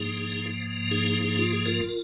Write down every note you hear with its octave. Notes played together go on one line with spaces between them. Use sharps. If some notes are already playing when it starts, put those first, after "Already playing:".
Already playing: G#2 F3 A#3 D#4 G#4
D#4 G#4
D#4
F4
G#4
F4 A#4